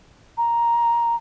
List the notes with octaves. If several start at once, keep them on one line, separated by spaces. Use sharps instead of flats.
A#5